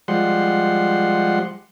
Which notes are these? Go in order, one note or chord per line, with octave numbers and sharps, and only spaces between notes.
F3 G3 G#3 F#5 C6